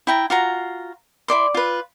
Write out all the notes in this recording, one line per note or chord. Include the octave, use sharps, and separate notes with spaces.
E4 G5 A#5
F4 F#4 A#5
E4 A4 D5 C6
F4 B4